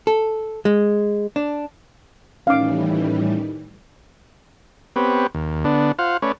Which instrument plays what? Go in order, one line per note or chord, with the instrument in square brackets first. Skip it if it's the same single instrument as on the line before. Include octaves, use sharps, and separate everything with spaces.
[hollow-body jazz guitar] A4
G#3
D4
[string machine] A2 E3 G3 [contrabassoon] D#3 [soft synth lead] C#4 [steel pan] F5 D6
[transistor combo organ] B3 C4 G4 B4 C#5
D#2
D3 B3 D4
F4 C5 F5 F#5
A3 C#4 B4 C#5 D5